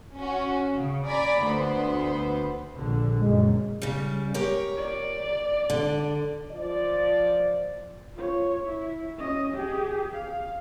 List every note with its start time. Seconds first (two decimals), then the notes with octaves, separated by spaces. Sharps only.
0.15 C#4 F#4
0.75 C#3
1.06 D5 G#5 A#5 B5
1.43 D2 B3 C5
2.76 A#1 D3
3.19 F#1 F#2 A#2 G#3
3.82 C#3 G3
4.34 G4 A#4 C#5
4.77 D5
5.70 D3
6.52 F3 D5
8.15 F4 C#5
8.64 E4
9.17 C#4 D#5
9.53 G4 G#4
10.13 F5